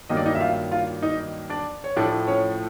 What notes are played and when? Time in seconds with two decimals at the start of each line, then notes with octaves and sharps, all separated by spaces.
0.09 G2 D#3 F#3 A#3 D#5
0.17 D5
0.26 D#4 D#5
0.35 E5
0.41 F4 F5
0.71 F4 F5
1.02 D#4 D#5
1.50 D4 D5
1.84 C#5
1.96 A2 F3 A3 D4 D5
2.27 C#4 C#5